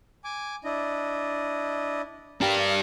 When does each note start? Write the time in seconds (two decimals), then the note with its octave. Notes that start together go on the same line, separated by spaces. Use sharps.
0.24 G#5 D6
0.64 D4 E4 D#5
2.41 D4 G4 A#4 F5